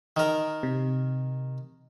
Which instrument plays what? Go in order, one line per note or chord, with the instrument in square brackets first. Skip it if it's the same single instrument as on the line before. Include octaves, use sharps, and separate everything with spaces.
[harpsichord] D#3 A#4
[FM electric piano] C3